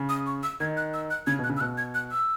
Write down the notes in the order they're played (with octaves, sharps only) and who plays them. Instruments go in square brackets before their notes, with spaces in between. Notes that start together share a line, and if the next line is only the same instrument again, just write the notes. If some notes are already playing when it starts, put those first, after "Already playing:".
Already playing: [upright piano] C#3
[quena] D#6
C#6
E6
[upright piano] D#3 [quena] G#6
[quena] F#6
E6
F#6
[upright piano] C#3 [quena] G#6
[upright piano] B2
[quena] F#6
[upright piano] C#3
[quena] E6
[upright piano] B2 [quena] F#6
[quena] G#6
F#6
E6